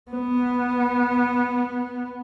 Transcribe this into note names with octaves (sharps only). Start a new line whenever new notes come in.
B3